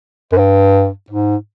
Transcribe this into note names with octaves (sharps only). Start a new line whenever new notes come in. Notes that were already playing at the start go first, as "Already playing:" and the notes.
F#2
G2
G#2